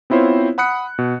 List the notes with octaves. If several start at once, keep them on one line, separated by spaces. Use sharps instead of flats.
B3 C4 E4 F4 C5 C#5
F#5 B5 D#6 F#6 C#7
B2